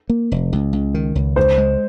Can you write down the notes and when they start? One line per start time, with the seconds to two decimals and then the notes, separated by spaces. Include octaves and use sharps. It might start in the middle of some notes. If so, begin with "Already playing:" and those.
0.10 A#3
0.32 F1
0.52 C#2
0.73 C#2
0.94 D#3
1.15 C#2
1.36 C#2 C5
1.58 G#3